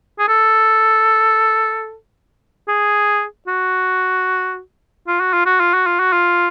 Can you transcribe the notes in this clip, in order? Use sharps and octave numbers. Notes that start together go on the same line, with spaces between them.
G#4
A4
G#4
F#4
F4
F#4
F4
F#4
F4
F#4
F4
F#4
F4